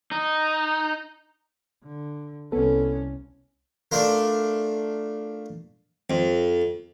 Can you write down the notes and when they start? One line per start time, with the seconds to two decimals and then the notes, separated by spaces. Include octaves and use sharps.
0.12 D#4
1.84 D3
2.52 C2 B3 C#4 A4
3.92 A3 D4 F4 A#4
6.10 F2